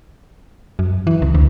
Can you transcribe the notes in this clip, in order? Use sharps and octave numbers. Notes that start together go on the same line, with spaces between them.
F#2
E3
C#2
D2